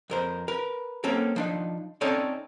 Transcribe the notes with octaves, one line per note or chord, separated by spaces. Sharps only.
F2 A#4 C5
A#4 B4
A#3 C4 C#4 A4 A#4
F3 D4 D#4
C4 C#4 D#4 A4 C#5 D5